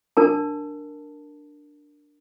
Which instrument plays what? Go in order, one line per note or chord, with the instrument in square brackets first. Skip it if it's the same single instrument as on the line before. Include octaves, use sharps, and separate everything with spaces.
[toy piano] D4 A#4 A5